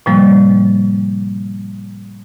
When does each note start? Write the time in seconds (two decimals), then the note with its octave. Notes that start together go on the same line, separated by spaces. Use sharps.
0.06 A2 C3 F3 G3 A#3